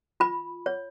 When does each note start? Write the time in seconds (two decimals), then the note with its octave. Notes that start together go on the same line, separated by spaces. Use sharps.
0.20 F4 B5
0.66 C#5